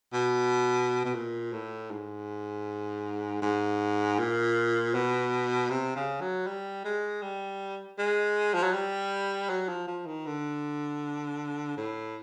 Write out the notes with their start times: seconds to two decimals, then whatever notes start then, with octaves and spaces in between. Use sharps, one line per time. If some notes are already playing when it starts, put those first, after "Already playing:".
0.13 B2
1.05 B2
1.15 A#2
1.53 A2
1.91 G#2
3.42 G#2
4.19 A#2
4.94 B2
5.70 C3
5.96 C#3
6.21 F#3
6.47 G3
6.85 G#3
7.22 G3
7.99 G#3
8.54 F3
8.63 F#3
8.74 G3
9.50 F#3
9.68 F3
9.87 F3
10.06 D#3
10.26 D3
11.77 A2